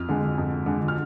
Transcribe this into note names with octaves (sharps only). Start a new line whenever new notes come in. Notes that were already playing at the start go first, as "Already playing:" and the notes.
Already playing: F2 F6
D3 G#3
F2
D3 G#3
F6